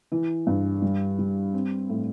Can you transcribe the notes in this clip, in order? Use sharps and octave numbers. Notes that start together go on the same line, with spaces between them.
E3
G2
G3
G3
C4
A2